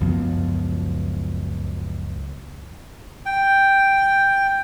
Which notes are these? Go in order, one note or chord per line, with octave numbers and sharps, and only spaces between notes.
C#2 F#2 F3 B3
G5